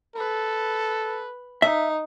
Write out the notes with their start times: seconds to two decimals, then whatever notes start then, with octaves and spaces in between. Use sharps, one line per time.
0.16 A4 B4
1.62 D#4 E5